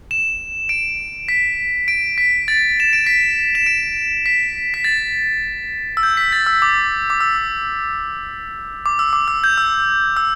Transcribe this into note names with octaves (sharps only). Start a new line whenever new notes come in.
E7
D7
B6
D7
B6
A6
E7
D7
B6
E7
D7
B6
B6
A6
E6
G6
B6
A6
E6
D6
D6
E6
D6
E6
D6
E6
G6
E6
E6